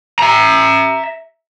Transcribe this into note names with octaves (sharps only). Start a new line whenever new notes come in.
E5 A#5